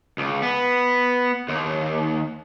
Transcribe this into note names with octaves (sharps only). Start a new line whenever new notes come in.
C#2
B3
D#2